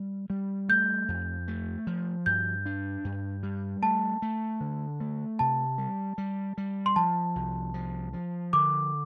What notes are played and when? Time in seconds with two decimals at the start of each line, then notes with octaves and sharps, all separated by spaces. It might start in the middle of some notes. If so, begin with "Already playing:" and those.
Already playing: G3
0.30 G3
0.69 A3 G6
1.08 F2
1.48 A3
1.87 F3
2.26 G2 G6
2.66 D4
3.05 G2
3.43 G3
3.82 A3 A5
4.22 A3
4.60 D3
5.00 A3
5.39 C3 A5
5.78 G3
6.18 G3
6.58 G3
6.86 C6
6.96 F3 A5
7.36 C2
7.74 F3
8.13 F3
8.53 D3 D6